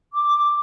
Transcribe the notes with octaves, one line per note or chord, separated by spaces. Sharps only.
D6